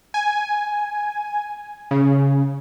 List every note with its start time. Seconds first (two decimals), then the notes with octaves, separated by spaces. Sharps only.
0.14 G#5
1.91 C#3